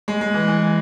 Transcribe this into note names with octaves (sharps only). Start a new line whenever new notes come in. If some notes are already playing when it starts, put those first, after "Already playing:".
G#3
G#3
E3
E3